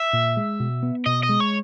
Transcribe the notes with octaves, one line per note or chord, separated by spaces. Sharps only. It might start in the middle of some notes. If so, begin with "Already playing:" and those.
Already playing: E5
A#2
G#3
B2
B3
B2 D#5
D#5
G#3
C#5